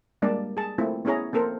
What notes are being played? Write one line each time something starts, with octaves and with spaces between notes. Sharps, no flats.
G3 G#3 A#3 D4 D5 A5
G#4 A5
A3 A#3 C4 E4 F4
B3 C#4 E4 G#4 C#5 A#5
A#3 C4 A4 A#4 C5